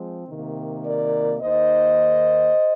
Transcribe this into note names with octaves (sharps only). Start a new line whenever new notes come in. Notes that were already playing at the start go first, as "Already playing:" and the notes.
Already playing: F3 G#3 C4
C3 D#3 A#3
A#4 D5
D#2 D#3 A#3 C5 D#5